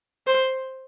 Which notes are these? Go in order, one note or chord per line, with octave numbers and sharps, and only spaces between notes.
C5